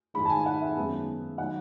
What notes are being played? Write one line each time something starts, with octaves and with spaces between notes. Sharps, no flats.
G#2 D#3 G#3 D#4 B5
A5
G#5
F#5
E5
F#2 D#3 G#3 B3
D#3 F#3 F#5